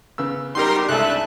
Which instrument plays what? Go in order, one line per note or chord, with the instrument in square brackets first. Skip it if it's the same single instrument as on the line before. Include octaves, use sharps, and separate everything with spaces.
[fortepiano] C#3 B3 E6
[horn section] F#2 G3 [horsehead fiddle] D#4 G4 [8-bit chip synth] A#4 C6
[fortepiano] C2 G#3 G#5 [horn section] C#3 A3 [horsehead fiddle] D4 E5 [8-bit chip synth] F#6